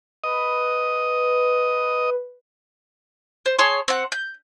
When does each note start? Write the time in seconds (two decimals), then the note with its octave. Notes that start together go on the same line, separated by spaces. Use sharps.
0.24 B4 D#5
3.46 C5
3.59 G#4 C#5 A5 C6
3.88 C4 F#5
4.12 G6